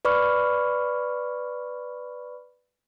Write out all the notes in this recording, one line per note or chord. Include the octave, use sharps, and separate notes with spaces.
B4 D5 B5 C#6 F6